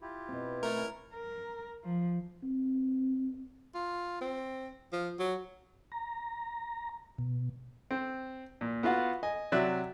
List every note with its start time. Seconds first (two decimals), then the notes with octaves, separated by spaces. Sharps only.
0.01 E4 F4 G4
0.28 B2 C4
0.63 A3 A#4
0.75 G#3 C#4 E4
1.14 A#4
1.84 F3
2.43 C4
3.75 F4
4.21 C4
4.93 F3
5.19 F#3
5.92 A#5
7.18 B2
7.91 C4
8.61 A#2
8.83 B3 F4 F#4 F5 F#5
9.23 D#5 G#5
9.52 C3 F#3 D5 E5 F#6